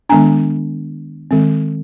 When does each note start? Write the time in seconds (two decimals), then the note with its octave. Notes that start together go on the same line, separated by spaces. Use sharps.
0.09 D#3 G#3 B3 D4 G#5 A#5
1.31 D#3 G#3 C4